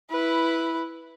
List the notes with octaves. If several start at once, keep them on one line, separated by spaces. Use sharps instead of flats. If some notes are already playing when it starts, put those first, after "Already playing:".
E4 B4